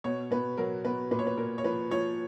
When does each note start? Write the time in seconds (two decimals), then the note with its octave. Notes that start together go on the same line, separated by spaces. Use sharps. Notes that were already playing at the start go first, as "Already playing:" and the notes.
0.04 B2 C#5
0.31 B2 B4
0.57 F#3 A#4
0.85 B2 B4
1.11 A#2 B4
1.19 C#5
1.27 B4
1.37 A#2 A#4
1.58 C#5
1.64 F3 B4
1.91 F3 C#5